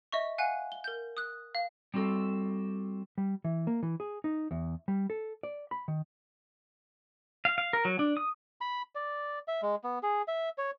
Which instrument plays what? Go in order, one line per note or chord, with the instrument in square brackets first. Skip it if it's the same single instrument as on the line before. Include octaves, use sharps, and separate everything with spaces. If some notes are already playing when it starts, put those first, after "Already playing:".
[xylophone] D#5 E5 C#6
F5 F#5 G#5 F#6 D#7
G7
A#4 G6
D#6 F#6
F5
[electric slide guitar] G3 C4 F#4 A4
[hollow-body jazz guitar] G3
E3
A#3
E3
G#4
D#4
E2
G3
A4
D5
B5
D#3
[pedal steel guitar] F5
F5
A#4
F#3
D4
D#6
[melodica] B5
D5
E5
G#3
B3
G#4
E5
C#5